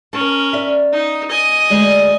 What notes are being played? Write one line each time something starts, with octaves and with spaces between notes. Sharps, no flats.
C#4 A#4 A5
D5 E5
D#4
D#5 G#5
D2 G#3 D5